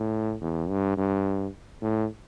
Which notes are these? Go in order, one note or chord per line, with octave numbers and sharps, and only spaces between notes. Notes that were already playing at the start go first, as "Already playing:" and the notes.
Already playing: A2
E2
G2
G2
A2